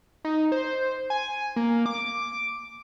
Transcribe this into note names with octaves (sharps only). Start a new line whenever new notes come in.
D#4
C5
G#5
A#3
D6